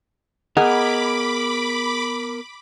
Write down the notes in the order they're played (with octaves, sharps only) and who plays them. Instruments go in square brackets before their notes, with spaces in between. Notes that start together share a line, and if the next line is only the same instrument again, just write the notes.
[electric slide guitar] B3 A#4 [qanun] G#4 [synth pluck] D#5 F#5 [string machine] B5 D6